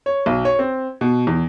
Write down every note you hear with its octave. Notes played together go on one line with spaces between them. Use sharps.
C#5
B1
C#5
C4
B2
E2